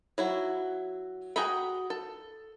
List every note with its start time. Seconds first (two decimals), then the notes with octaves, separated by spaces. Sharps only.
0.18 F#3 E4 F#4
1.36 F#4 G#4 G5 A#5 B5
1.90 A4